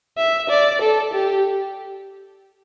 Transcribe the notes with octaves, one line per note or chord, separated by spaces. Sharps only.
E5
D5
A4
G4